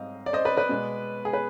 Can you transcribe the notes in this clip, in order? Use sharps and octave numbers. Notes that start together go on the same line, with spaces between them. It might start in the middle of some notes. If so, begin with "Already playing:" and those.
Already playing: G#2 G3 C4 D#5 F5
D5
C5 D#5
B4 D5
B4 D5
B2 G#3 B3
G#4
B4